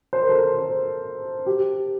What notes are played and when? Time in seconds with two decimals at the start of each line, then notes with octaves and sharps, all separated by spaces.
0.13 C5
0.22 A#4
0.29 A4
0.37 A#4
0.58 C5
1.46 G4